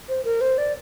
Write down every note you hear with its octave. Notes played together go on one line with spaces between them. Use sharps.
C5
A#4
C5
D5